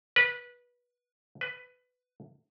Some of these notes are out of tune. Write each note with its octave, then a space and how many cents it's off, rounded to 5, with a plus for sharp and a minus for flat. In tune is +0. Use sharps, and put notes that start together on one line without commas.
B4 -20
B4 +15